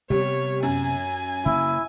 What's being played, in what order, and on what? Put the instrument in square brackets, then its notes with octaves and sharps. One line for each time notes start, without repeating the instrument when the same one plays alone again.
[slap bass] C3 B3 [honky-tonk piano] G3 [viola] C#5
[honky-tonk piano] F#2 [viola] G#5
[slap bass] C#3 A#3 [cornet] E4